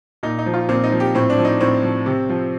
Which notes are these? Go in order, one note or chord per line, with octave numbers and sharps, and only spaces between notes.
A#2 D#4
D#4
F3
F4
A#2 C4
D#4
F3
G4
A2 C4
D4
F3
D#4
A2 C4
F3
C3
F3